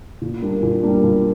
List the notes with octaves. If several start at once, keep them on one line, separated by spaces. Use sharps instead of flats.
A#2
G3 A#3 D4
A#2
G3 A#3 D4
A#2